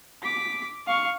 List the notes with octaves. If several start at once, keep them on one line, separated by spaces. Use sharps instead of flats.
D6 B6
F5 C#6